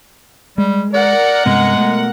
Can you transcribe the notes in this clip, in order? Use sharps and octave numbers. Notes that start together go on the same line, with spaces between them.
G3 G#3
A#4 D5 F#5
G2 C3 G#3 B3
B2 A3 B3